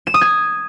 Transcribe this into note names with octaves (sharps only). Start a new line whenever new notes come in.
E7
D#6
G#6